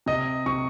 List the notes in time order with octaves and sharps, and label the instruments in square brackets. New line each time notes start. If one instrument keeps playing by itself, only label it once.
[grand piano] C3 D#5
C3 C#6